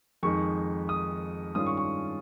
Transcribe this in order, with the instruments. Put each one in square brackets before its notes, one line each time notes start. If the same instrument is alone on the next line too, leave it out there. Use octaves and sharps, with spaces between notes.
[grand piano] F2 D#3 G#3 D#4 C#6
D#6
G2 D#3 G#3 C#4 F4 D#6
C#6
C#6